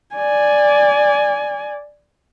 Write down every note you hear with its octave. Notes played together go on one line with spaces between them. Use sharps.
D5 G#5